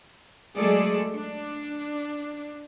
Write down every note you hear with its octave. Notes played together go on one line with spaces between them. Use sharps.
F#3 G#3 A3 G#4 A4 D5
D4